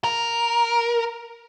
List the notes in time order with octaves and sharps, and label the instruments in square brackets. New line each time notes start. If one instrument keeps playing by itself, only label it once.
[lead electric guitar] A#4